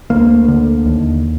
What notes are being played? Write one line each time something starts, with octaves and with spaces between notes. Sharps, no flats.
D2 A#3
D3
D#2